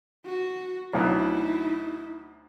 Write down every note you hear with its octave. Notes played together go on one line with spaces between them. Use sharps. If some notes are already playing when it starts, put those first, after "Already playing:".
F#4
D2 B2 F#3 D#4 E4